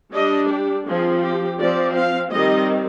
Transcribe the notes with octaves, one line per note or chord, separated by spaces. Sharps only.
G3 D4 D#5
G4
F3 C4 G#4
G4
F3 C4 D5
F5
D#3 G3 C4 D#5